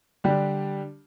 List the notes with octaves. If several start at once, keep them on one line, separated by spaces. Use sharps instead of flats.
D3 G3 D4 G4